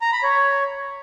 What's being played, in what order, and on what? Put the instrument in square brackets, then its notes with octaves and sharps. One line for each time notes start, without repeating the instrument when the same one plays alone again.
[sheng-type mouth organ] A#5
B5
C#5